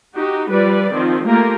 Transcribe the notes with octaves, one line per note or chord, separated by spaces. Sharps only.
D#4 F#4 G4
F3 G3 B4 D5
D#3 F3 C4
A3 A#3 F4 G4 A#4